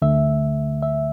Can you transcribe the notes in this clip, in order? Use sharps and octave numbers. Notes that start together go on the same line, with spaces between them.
D2 D3 A3 E5
E5